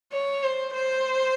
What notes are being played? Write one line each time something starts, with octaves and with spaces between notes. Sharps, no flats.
C#5
C5
C5